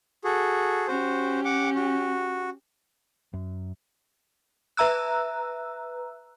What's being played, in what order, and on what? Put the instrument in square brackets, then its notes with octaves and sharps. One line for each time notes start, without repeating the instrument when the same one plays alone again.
[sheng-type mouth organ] F#4 G#4 A4
[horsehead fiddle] C#4 G4 [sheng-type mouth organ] F#4 C5
[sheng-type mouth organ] F#5 D6
F#4
[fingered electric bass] F#2
[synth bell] B4 E5 A#5 E6 F#6